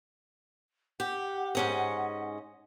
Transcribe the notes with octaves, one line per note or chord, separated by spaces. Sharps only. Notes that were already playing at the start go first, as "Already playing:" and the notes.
G4 F#5
G#2 C#4 D#5